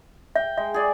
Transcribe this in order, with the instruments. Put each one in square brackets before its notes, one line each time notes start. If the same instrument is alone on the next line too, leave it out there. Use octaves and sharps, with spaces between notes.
[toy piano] E5 [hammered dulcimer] G5
[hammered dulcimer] G#3 [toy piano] E5
[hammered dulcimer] G#4 D5